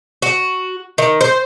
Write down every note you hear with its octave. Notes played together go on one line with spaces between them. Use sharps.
F#4
D#3
C5